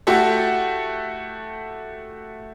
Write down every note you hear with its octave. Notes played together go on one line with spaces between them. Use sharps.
A3 E4 F#4 G4 A4